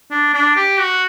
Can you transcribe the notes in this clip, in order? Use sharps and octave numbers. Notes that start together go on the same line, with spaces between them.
D4
D4
G4
F#4